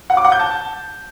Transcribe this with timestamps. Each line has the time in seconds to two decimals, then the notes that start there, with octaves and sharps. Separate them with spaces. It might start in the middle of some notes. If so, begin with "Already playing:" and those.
0.10 F#5
0.17 D6
0.25 F#5
0.32 G6
0.39 A5